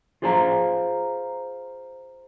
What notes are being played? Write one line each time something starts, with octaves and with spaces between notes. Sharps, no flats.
F4 G#4 C5 F5 F#5 A#5